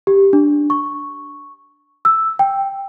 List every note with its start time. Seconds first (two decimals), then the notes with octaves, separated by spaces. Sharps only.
0.07 G4
0.33 D4
0.70 C#6
2.05 E6
2.39 G5